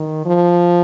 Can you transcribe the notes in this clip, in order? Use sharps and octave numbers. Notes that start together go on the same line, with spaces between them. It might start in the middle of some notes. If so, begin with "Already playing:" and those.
Already playing: D#3
F3